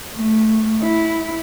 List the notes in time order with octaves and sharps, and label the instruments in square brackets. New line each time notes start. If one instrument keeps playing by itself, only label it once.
[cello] A3
E4